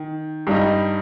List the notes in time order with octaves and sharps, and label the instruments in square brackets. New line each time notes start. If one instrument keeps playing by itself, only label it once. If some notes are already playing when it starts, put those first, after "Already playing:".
Already playing: [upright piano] D#3
G2 G3 D#4